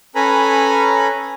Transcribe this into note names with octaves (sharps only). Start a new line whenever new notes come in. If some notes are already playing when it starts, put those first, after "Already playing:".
C#4 A4 B4 G#5 A#5 B5